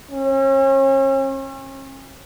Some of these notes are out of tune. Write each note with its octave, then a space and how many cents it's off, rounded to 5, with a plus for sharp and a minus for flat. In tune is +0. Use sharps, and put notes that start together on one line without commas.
C#4 -40